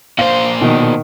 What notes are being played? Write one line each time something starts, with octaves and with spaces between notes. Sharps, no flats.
A#2 C5 F5
B2 D#3